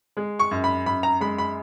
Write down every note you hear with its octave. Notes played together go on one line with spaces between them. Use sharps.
G#3
C#6
F#2
B5
F#2 B5
A#5
G#3 B5
B5